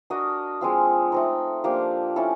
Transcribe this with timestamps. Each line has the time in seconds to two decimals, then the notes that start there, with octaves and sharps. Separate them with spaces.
0.10 D4 F#4 A#4 D#5
0.61 F3 G#3 C4 F4
1.12 A3 C4 D#4
1.64 F3 A#3 D4 G4
2.16 C#4 E4 A4